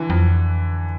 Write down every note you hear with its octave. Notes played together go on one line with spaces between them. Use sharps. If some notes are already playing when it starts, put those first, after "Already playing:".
Already playing: D3 E3
F2